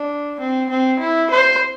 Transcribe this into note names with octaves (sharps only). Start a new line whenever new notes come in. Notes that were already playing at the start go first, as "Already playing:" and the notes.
Already playing: D4
C4
C4
E4
C5